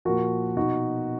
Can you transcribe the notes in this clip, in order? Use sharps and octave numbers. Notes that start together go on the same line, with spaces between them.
A#2 F3 F#4 A#4
B2 D#4 F#4